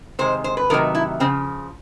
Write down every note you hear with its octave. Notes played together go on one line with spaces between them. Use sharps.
C3 D#3 G#3 C5
C5
B4
C3 D#3 F#3 A3 A#4
E4
C#3 F3 C4